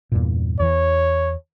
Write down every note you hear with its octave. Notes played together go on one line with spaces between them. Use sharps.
E2 G2 A#2
E2 E3 C#5